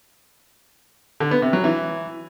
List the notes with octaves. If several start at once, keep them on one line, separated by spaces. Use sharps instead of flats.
D3
B3
C3
F#3
E3